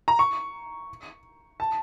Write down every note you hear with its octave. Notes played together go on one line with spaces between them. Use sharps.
A#5
C#6
A5